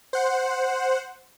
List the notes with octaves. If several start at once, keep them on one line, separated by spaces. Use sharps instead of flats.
C5 F#5